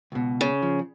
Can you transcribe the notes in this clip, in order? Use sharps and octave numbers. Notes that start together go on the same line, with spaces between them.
C#2 B2
C#3
F3